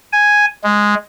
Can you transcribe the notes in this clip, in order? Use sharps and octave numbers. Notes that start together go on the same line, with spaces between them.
G#5
G#3